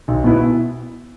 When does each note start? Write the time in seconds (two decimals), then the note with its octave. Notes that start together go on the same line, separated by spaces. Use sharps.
0.08 B1
0.24 B2 B3 E4